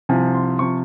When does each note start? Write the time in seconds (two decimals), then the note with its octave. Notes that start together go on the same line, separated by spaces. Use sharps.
0.09 C2 C3 F3 G#5
0.34 C6
0.59 C3 F3 C#6